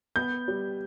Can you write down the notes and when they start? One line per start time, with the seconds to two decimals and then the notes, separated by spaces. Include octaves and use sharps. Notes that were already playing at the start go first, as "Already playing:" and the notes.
0.16 B3 G6
0.48 G3